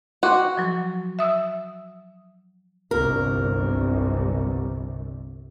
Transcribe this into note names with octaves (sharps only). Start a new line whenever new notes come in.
F#4 G5 C6 D6
F3 F#3
E5 D#6 E6
G1 C2 A#4